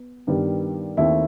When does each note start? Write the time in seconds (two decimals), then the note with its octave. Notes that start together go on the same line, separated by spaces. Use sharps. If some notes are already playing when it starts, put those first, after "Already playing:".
Already playing: B3
0.27 G2 D#3 G3 B3
0.97 D#2 D#3 A3 C4 E4